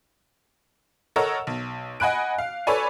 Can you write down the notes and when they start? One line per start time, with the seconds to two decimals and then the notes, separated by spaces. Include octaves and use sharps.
1.16 A4 A#4 C#5 D#5 F#5 E6
1.47 B1
2.00 D#5 F#5 G#5 B5 F#6 D7
2.38 F5
2.67 A4 B4 C#5 D5 G#5